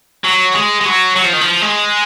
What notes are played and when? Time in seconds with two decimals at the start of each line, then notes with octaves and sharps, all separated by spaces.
0.24 F#3
0.55 G#3
0.81 G#3
0.86 F#3
1.16 F#3
1.25 F3
1.33 D#3
1.41 F3
1.63 G#3